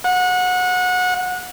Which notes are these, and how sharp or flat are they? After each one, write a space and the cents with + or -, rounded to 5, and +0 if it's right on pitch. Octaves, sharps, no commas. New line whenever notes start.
F#5 -25